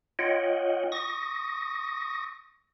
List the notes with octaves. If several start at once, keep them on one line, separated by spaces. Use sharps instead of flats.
F4 C#5 D#5 F#5 G5
C#6 D#6 A#6